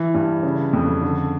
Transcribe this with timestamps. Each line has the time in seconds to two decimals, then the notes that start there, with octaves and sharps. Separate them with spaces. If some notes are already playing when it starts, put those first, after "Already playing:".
Already playing: E3
0.14 G2
0.43 C#3
0.73 F2
1.02 D3